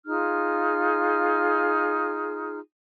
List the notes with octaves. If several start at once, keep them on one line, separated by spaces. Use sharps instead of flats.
D#4 F4 G#4 F6